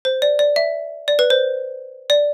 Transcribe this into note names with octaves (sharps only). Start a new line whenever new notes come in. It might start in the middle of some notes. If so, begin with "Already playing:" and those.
C5
D5
D5
E5
D5
B4
C5
D5